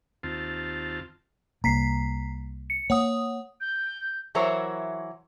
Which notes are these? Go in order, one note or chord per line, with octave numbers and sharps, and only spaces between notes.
D#2 C4 F4 A5
C2 A#3 A#5 B6 C7
C#7
A#3 C#5 F#5 D#6
G6
E3 F#3 E4 A#4 C5 C#5